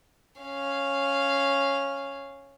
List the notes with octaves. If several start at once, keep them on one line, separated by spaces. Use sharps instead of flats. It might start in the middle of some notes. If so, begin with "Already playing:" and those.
C#4 F5